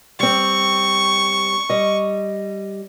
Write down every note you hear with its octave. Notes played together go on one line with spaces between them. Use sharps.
G3 C4 C#6
G3 D#5